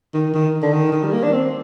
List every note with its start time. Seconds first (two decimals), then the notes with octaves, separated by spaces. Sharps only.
0.14 D#3
0.34 D#3
0.62 D3
0.73 D#3
0.92 D#3
1.03 G3
1.13 A#3
1.23 D4
1.32 C4